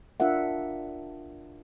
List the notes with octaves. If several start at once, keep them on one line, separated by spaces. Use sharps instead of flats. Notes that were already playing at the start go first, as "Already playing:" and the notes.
D4 F4 A#4 E5 F#5